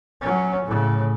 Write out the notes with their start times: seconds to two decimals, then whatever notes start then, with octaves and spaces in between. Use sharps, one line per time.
0.21 F#3 C#4
0.66 A2 C#3